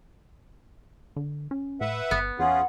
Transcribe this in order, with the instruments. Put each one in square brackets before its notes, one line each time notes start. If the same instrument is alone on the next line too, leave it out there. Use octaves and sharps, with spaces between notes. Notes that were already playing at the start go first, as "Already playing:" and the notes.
[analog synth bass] D3
C#4
[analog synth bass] A2 [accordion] B4 E5 F#5
[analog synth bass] G1 [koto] B3
[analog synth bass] E2 [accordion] C#4 F4 G#4 [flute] F#5